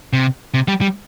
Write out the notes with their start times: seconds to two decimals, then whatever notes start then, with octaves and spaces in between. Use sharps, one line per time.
0.13 C3
0.54 C3
0.68 G3
0.81 G3